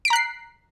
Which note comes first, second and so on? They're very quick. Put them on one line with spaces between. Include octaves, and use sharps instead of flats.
D7 B6 A#5 F#6 C7